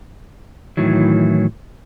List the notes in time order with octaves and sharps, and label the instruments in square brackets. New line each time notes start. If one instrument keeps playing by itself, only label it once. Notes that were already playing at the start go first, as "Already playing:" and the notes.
[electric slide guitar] A2 D#3 E3 F#3